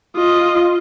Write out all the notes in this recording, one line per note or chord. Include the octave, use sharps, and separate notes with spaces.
F4 D#5